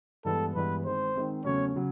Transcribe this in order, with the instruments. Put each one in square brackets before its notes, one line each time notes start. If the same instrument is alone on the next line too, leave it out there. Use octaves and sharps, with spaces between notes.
[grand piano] G2 E3 G#3 B3 [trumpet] A4
[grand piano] G2 E3 G#3 B3 [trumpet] B4
[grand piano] D#3 G#3 C4 [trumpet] C5
[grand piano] D#3 G#3 C4
[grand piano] E2 C#3 F#3 A3 C#4 [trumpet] C#5
[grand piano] C#3 F#3